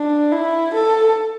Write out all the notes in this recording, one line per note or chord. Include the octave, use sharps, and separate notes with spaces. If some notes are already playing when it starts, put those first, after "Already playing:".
Already playing: D4
E4
A4